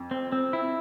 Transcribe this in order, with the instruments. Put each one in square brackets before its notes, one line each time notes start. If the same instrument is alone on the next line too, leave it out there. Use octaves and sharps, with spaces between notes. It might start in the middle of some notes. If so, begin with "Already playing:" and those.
Already playing: [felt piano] F2
[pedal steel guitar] C4
C4
E4